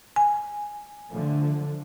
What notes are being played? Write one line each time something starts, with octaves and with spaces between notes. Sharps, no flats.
G#5
D3 F3 A3